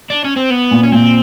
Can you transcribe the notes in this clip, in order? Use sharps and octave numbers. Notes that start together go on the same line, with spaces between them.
D4
C#4
C4
B3
A#2
C#4
A#2 C4